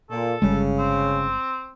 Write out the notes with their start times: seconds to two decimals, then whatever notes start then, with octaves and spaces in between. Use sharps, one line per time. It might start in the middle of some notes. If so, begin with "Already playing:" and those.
0.11 A#2 A4
0.42 G1 C#3 G3 G#3
0.79 C4